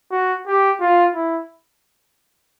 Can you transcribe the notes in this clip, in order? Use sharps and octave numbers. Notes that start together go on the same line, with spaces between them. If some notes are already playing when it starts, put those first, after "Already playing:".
F#4
G4
F4
E4